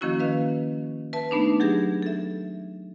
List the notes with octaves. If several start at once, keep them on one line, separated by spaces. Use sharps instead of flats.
D#3 F3 A#3 C#4 E4 F#4
B4 D#5 F5
B4 E5 A5
A3 B3 D4 D#4
F#3 G4 G#4 G#6 A#6
A4 E5